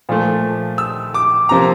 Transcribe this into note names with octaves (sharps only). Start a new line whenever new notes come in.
A#2 F3 A3
E6
D6
C3 F3 A#3 A#5